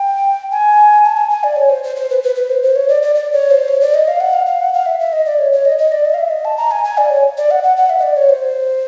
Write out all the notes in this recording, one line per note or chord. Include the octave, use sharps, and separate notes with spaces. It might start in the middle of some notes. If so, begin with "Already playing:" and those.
Already playing: G5
G#5
A5
G#5
G#5
D5
C#5
C5
C5
C5
B4
B4
B4
C5
C5
C#5
D5
D5
D5
C#5
C5
C#5
D5
D#5
F5
F#5
F5
F5
F#5
F5
E5
E5
D#5
D5
C#5
C#5
D#5
D#5
D5
D#5
F5
E5
D#5
A5
A#5
G#5
G#5
D5
C#5
D5
F#5
F#5
F#5
E5
D#5
D5
C#5
C5